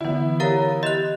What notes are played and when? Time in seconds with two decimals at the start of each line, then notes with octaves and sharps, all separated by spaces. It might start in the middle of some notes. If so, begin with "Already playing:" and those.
0.01 D3 E3 B3 E4
0.40 G4 A#4 C#5 F5 A#5 A6
0.83 G4 D#5 C6 F#6 A6 E7 F7